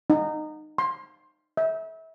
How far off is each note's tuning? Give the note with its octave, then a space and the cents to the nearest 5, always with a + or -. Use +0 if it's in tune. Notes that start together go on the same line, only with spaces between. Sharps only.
D#4 -20
C6 +15
E5 -30